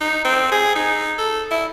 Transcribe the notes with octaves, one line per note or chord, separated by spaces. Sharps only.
D#4
C4
G#4
D#4
A4
E4